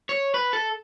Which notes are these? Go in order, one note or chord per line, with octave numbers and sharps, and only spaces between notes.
C#5
B4
A4